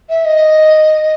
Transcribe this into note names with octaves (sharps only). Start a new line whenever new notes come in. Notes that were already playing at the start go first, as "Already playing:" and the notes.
E5
D#5